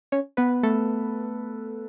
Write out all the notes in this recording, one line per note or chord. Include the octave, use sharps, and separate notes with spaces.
C#4 C#5
B3 B4
A3 A4